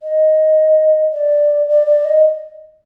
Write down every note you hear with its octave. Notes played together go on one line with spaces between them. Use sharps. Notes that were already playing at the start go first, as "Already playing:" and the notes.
D#5
D5
D5
D5
D#5